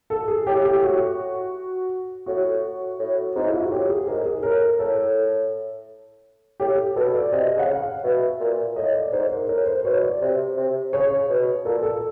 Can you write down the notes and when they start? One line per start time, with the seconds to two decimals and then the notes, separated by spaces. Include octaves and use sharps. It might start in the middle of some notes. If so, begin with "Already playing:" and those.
0.10 A4
0.28 G#4
0.47 A2 G4
0.64 G4
0.83 F#4
2.26 A2 F#4
2.99 A2
3.35 G#2 D#4
3.45 E4
3.54 F4
3.62 F#4
3.71 A2 G4
3.89 G#4
4.07 G#2 A#4
4.26 G#4
4.43 A2 A#4
4.79 A2 A4
6.60 A2 G4
6.96 B2 A4
7.15 D5
7.32 C3 D#5
7.56 C#3
7.59 F#5
7.68 F5
8.04 B2 E5
8.40 A#2
8.76 A2 D#5
8.95 D5
9.12 G#2 C5
9.30 A#4
9.48 A2 A#4
9.66 C5
9.84 B2 C#5
10.03 D5
10.21 C3
10.57 C3
10.93 C#3 C#5
11.29 B2
11.65 A#2 A4
11.83 A4